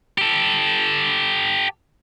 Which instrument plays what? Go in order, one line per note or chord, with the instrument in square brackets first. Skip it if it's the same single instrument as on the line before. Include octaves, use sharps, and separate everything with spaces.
[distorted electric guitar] G4 A4